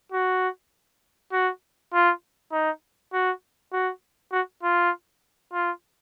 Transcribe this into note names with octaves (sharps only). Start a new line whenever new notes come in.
F#4
F#4
F4
D#4
F#4
F#4
F#4
F4
F4